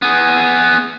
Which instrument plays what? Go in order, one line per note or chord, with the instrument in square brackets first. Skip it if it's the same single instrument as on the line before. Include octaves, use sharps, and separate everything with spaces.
[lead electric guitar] B3 G#4